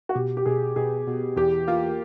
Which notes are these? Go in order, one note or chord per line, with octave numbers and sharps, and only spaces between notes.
F#4
B2 G4
G4
B2 G#4
B2 G#4
B2
E2 G4
A#3 F4